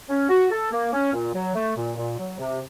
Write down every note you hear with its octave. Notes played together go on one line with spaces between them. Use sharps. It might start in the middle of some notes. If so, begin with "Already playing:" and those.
C#4
F#4
A4
A#3
C#4
A#2
F#3
A3
A#2
A#2
F#3
C3